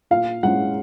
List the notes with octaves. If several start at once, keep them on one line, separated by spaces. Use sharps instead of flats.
A#2 F5
G#3 C#4 F#5